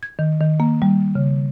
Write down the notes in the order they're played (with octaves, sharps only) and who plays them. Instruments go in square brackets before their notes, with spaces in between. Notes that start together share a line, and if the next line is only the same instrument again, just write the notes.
[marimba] G#6
D#3
D#3
A#3
G3
C#3